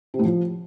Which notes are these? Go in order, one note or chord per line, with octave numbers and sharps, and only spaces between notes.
C3
A2
F3